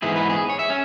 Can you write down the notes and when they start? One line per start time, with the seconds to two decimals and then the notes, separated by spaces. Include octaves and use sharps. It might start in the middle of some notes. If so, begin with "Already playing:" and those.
0.02 G#2 E3 B3 E4 G#4
0.16 B4
0.30 G#4
0.50 C#5
0.59 E5
0.70 C#4